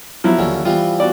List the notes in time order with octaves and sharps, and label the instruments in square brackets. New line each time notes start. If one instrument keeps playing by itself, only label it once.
[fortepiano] F3 F#3 E4
[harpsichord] D#2 D3 C#4
[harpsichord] E3 F3 G3 [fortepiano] F4
[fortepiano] F#4 D5